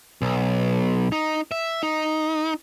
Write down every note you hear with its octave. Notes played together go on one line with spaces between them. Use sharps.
B1
D#4
E5
D#4